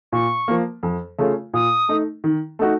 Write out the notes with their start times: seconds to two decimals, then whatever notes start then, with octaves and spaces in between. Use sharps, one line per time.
0.12 A#2 C#6
0.48 F3 A#3
0.83 F2
1.19 C#3 A3 C#4 F4
1.54 A#2 D#6
1.89 A3 D#4
2.24 D#3
2.59 A3 D#4 F#4